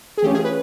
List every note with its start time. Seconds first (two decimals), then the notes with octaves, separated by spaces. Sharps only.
0.18 G#4
0.23 E3 A3 C#4 F4 G4
0.34 G#4
0.44 B4